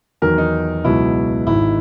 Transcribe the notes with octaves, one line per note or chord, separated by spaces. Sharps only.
E2 D#3 F#3 A#4
D#4
C#2 B2 F#3 E4
G#1 G#2 D#3 E4